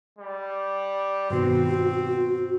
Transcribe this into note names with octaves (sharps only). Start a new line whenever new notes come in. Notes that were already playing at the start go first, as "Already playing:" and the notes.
G3
G2 B2 D#3 C4 F#4